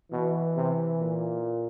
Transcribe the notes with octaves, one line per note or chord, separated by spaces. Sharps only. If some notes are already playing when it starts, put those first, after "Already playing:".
B2 E3
C3
A#2